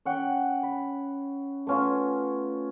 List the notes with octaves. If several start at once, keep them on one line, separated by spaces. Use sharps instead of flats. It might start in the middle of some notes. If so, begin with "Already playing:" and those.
C#4 F#5 G5
B5
A3 B3 C#4 F4